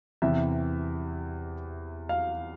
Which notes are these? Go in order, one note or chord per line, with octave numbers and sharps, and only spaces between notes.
E2 C3 E3 E5
F5